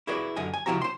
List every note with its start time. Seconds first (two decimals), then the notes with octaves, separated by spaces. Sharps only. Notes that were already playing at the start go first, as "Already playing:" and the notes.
0.07 E4 F#4 G#4 B4 D5
0.36 F#2 D3 D#5 G#5
0.54 G#5
0.66 C#2 F3 E4 F#4 G4 A#5
0.82 C5 C6